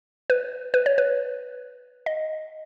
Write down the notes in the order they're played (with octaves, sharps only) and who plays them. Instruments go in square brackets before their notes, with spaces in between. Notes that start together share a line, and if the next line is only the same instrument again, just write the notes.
[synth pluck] B4
B4
C#5
B4
D#5